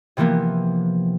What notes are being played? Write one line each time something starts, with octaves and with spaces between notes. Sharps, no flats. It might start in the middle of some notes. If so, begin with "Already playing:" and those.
C3 E3 F3 A#3 B3